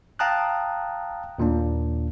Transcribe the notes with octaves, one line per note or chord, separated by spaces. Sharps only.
F5 G5 A5 A#5 D#6 F#6
D#2 A#2 A#3 D4